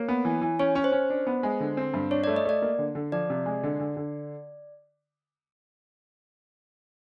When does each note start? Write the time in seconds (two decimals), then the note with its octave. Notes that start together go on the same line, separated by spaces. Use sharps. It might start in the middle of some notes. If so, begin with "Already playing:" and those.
Already playing: A#3 C#5
0.08 B3
0.25 E3
0.41 E3
0.59 C#4 C#5
0.75 C#4
0.84 C5
0.92 C#4
1.10 D4
1.27 B3
1.43 G#3
1.60 D3
1.77 C4
1.94 G2
2.11 D4 C#5
2.24 A3 D5
2.36 D#5
2.45 A3 D5
2.62 A#3
2.79 D3
2.95 D3
3.12 F3 D5
3.30 C3
3.46 G#3
3.63 D3
3.80 D3
3.97 D3